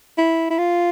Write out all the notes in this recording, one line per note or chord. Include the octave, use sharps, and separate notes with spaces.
E4
E4
F4